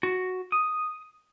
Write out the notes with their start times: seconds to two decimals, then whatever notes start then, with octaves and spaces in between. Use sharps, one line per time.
0.03 F#4
0.52 D#6